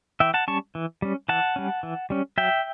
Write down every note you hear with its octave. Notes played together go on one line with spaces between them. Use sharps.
E3 E5 G5
F#5 A5
G3 C#4 A5 C#6
E3
G3 C#4
E3 F#5 A5
G3 C#4
E3
G3 C#4
F#3 E5 G5